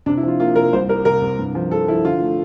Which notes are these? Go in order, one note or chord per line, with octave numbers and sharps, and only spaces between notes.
C3 D4
E4
F3 F4
A#3 F4
C3 A#4
C2 C5
G3 A#4
C3 A#4
C3
G2
F3
F3 A4
F3 E4
D3 F4
A3